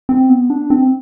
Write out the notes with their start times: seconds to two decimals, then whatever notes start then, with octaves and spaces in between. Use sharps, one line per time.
0.09 C4
0.30 B3
0.50 D4
0.70 C4